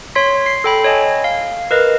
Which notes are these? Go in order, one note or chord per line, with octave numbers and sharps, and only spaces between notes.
C#5 C6 B6
C7
A4 G5 B5
C#5 D#5 G#5
F5
A#4 B4 D#5